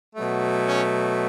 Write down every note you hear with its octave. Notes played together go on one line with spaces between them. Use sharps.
B2 F#3 A3
C#4